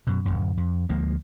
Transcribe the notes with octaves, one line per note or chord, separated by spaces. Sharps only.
F#2 B2
D1 G#1 F#2
F2
D2 F3 G#3 A#3